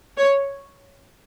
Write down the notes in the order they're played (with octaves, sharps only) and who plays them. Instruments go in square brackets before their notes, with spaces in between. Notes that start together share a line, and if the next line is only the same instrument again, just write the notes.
[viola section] C#5